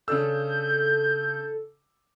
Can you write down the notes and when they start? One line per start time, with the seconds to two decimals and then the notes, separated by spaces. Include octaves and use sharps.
0.08 C#3 D4 A4 E6 G6